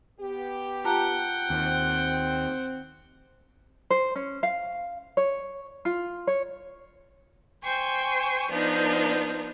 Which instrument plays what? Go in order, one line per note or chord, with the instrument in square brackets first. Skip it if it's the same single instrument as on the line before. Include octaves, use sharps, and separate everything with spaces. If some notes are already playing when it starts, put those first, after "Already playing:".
[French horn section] B3 G4
[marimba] F4 A5 A#5 [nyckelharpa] F#5 G5
[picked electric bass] D#2 [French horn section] C4
[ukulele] C5
C#4
F5
C#5
F4
C#5
[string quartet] C5 G5 G#5 C#6
F3 B3 D4 D#4